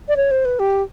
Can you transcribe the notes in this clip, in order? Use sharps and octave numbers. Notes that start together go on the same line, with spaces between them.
D5
C#5
C5
B4
G4